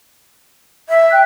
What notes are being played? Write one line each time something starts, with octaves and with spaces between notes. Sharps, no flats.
E5
G5 F#6